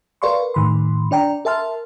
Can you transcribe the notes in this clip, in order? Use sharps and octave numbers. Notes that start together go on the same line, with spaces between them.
A#4 B4 D5 F5 C6 C#6
A2 D#3 B5 C6
D4 D5 G5 A#5
A#4 E5 A5 C6 F6